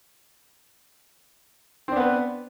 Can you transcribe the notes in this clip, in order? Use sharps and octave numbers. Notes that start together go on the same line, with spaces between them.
B3 C4 D4 B4